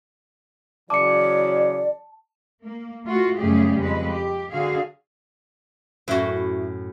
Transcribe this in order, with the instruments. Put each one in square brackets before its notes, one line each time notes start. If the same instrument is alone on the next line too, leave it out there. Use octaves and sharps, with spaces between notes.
[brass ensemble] C#3 E3 F#3 [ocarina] D5 [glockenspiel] A5 [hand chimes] D6 C#7
[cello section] A#3
A3 F4 F#4
F#2 C#3 G3 A3 G4 G#4
F2 G#3 B4
G4
D3 F#4 G#4 F5
[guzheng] F#2 A2 [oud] E4 F#4